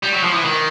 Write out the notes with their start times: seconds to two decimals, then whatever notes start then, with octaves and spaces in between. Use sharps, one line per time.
0.03 G3
0.13 F#3
0.23 F3
0.33 E3
0.44 D#3